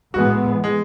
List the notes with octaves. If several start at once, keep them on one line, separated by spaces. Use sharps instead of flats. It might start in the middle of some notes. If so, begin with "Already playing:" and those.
A2 E3 G#3 B3 F#4
G#3